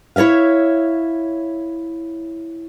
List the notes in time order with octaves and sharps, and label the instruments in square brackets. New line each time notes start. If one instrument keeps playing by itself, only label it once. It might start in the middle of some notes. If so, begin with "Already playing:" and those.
[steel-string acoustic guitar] E4 C#5 D5 E5 F5